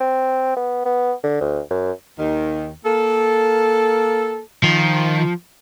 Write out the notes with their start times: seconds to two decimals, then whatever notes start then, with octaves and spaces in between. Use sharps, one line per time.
0.01 C4
0.57 B3
0.86 B3
1.24 D3
1.41 D2
1.71 F#2
2.18 D#2 D#3
2.85 A#3 A4
4.64 D#3 F3